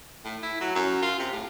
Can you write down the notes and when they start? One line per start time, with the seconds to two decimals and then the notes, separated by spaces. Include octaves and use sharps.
0.25 A2
0.43 E4
0.60 F#3
0.75 F#2
1.02 F4
1.19 C3
1.33 A2